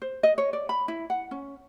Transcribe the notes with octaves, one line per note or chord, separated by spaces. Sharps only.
C5
D#5
C#5
D5
B5
E4
F#5
C#4